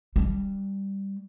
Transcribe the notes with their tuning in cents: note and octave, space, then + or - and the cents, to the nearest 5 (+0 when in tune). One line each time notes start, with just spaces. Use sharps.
G3 +0 D4 -20